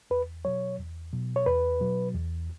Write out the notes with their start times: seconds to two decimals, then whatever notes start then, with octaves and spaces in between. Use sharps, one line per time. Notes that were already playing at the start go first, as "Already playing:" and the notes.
0.10 E2 B4
0.45 B2 F#3 C#5
0.78 E2
1.13 B2 F#3
1.36 C#5
1.46 E2 B4
1.80 B2 F#3
2.14 E2